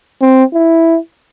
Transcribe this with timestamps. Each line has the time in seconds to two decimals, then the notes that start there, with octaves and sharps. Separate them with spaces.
0.22 C4
0.54 E4